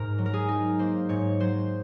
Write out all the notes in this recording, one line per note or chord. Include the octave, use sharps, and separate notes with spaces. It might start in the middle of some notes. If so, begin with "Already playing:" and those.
Already playing: G#2 A#4
F#3
A#4
G#4
D#4
A#3 C5
G#2 C#5
F#3 C5